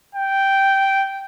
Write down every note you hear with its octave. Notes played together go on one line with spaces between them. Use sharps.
G5